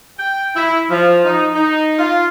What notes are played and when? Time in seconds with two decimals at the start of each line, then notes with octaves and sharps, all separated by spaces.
0.18 G5
0.56 E4
0.90 F3
1.25 D#4
1.54 D#4
1.98 F4